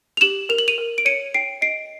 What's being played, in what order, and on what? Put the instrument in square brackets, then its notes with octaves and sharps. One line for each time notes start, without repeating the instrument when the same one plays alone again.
[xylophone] F7
G4 E7 F#7
A#4 F7
F#7
D#7 F7
A#4
D7
C#5 C#7 D#7
G5 C7 D7
D#5 C7 D7